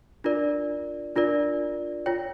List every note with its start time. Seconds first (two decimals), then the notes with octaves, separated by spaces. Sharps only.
0.24 D4 F4 A#4 D5
1.16 D4 F4 A#4 D5
2.06 F4 C#5 G5